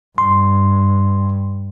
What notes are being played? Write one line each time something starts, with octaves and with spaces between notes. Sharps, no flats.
G2 C6